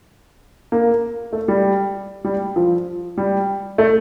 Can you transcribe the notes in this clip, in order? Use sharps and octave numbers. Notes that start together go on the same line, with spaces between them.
A#3
A3
G3
G3
F3
G3
A3